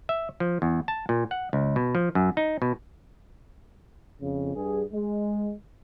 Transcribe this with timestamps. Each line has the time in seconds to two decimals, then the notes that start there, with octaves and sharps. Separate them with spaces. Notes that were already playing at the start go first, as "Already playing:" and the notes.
0.09 E5
0.40 F3
0.62 E2
0.88 A5
1.09 A#2
1.31 F#5
1.53 C#2
1.76 B2
1.95 F3
2.15 F#2
2.37 D#4
2.62 B2
4.22 F2 C#3
4.56 G2 G#4
4.93 G#3